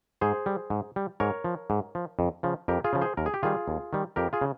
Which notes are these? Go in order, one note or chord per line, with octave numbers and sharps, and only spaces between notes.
G#2 G#4 C5
G3
G#2
G3
G#2 A#4 C#5
F3
G#2
F3
F2
C#3 F3
F2 G4 A#4
F4 G#4
C#3 F3
G#4 C5
D#2 A#4
G#4
G4
D#3 G3 F4 G#4
D#2
D#3 G3
F2 G4 A#4
F4 G#4
C#3